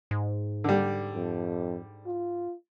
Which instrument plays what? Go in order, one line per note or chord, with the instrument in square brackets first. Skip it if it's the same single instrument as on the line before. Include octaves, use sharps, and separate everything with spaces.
[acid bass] G#2
[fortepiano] D3 G3
[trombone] F2
F4